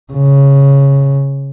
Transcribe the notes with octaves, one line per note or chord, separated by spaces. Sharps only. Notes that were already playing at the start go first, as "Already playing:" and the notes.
C#3